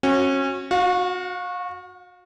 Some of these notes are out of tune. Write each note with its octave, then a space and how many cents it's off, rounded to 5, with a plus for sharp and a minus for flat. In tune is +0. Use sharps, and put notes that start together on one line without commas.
C#4 -30 F#4 -15
F#4 -20 F5 +35